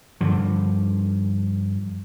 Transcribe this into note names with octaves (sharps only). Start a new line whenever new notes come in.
G2 D3 F3